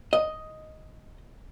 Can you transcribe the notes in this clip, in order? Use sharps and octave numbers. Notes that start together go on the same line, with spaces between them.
D#5